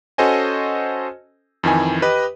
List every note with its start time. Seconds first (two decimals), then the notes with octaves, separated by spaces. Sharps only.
0.18 C#4 F#4 A4 C5 D#5 G#5
1.63 F2 D#3 E3 G#5
2.02 G4 B4 D#5